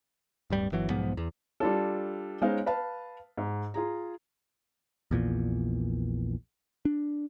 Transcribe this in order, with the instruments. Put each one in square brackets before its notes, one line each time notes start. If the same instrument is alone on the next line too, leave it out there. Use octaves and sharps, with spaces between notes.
[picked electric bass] D1 G2 G3
G1 E3 F#3
B1 G#2 F3 B3
E2
[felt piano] G3 D4 F4 A4
G#3 B3 C#4 D#4 C5 F5
B4 F5 A5
G#2
F4 G#4 A#5
[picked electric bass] A#1 E2 A#2
D4